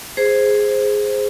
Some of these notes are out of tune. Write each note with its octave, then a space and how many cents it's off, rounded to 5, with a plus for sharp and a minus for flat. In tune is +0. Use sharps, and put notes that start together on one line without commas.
G#4 +0 C5 +0